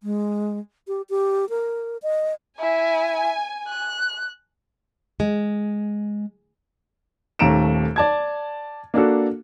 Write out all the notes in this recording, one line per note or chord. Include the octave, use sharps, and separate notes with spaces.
G#3
G4
G4
A#4
D#5
E4 G#5
F#6
G#3
D#1 D#2 A3 A#5 D7 E7
D5 A5 G#6
A#3 D4 F#4 A4